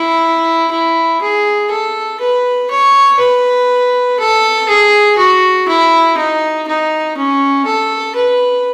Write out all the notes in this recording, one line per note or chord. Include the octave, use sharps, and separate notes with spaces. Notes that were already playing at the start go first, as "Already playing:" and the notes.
Already playing: E4
E4
G#4
A4
B4
C#5
B4
A4
G#4
F#4
E4
D#4
D#4
C#4
A4
B4